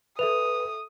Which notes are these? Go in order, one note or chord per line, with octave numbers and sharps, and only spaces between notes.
A4 B4 E5 D#6 F7